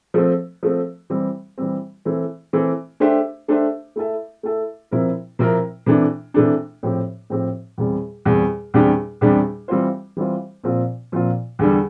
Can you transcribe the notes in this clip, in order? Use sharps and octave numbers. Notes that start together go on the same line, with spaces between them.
F3 A3 C4
F3 A3 C4
E3 G3 C4
E3 G3 C4
E3 A3 C4
E3 A3 C4
A3 D4 G4 C5 E5
A3 D4 G4 C5 E5
A3 E4 A4 E5
A3 E4 A4 E5
C3 F3 C4 E4 A#4
C3 F3 C4 E4 A#4
C3 E3 A3 D4
C3 E3 A3 D4
A2 F3 C4 G4
A2 F3 C4 G4
E2 C3 G3
E2 C3 G3
E2 C3 G3 D4 G4
E2 C3 G3 D4 G4
E3 G3 C4 F4 C5
E3 G3 C4 F4 C5
A#2 F3 C4 F4
A#2 F3 C4 F4
E2 D3 G3